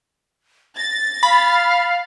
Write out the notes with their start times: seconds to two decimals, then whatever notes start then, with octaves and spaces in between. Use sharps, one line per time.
0.77 A6 A#6
1.23 F5 B5